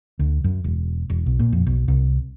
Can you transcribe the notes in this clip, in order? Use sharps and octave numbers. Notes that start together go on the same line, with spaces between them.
D2
F#2
E1
E1
B1
A#2
F2
B1
C2